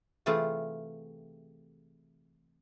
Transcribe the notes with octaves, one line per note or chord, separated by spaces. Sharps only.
C3 E3 A3 F4 G#4